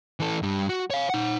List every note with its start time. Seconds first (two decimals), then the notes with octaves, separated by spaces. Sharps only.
0.20 E3 A4
0.42 G2 G3
0.69 F#4
0.90 C#5 F5
1.10 D#4 F#5